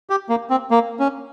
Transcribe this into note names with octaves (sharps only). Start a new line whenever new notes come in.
G4
A#3
C4
A#3
C#4